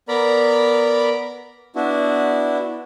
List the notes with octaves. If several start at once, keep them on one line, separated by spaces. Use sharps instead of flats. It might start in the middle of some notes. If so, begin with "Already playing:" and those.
B3 A#4 D5 A#5 B5
B3 D4 E4 F#4